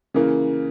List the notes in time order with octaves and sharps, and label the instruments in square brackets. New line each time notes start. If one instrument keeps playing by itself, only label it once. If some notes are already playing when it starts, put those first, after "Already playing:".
[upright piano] C#3 E3 A#3